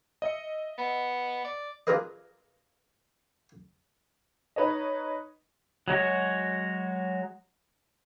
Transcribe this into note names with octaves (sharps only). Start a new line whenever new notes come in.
D#5 E5 C#7
B3
D5
D4 F4 G#4 A#4 B4 D#5
D#4 B4 C#5 D#5
F#3 G#3 F#4 C#5